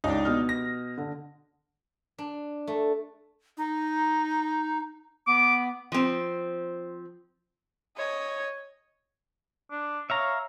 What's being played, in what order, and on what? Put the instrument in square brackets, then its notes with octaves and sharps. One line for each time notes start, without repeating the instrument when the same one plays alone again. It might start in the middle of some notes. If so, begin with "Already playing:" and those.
[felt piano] C#2 [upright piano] D4 D#4
[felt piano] B2 D#6 F6
[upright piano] A#6
[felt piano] D3
[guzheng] D4
A3
[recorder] D#4
[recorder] B3 [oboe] D6
[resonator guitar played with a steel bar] F3 C4
[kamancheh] C#5 D#5
[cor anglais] D4
[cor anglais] C#5 [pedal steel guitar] E5 F5 A#5